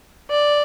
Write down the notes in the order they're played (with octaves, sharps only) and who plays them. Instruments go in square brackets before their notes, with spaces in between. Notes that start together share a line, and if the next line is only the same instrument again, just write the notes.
[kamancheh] D5